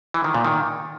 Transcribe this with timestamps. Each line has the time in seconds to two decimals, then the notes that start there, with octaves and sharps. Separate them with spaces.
0.14 E3
0.24 D#3
0.34 A#2
0.45 D#3